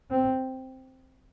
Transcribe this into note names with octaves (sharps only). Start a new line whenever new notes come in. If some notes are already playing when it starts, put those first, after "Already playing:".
C4